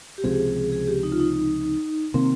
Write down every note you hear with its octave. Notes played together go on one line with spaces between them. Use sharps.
G4
C#2 C3 F3 C4 G#4
G#4
G4
D#4
F4
D#4
C3 D#3 A#3 C4